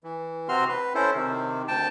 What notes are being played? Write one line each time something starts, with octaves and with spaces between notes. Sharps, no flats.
E3
C3 C4 F#4 C6 F6
B4
C#4 E4 A4 C5
C3 D#3
D2 G5 A5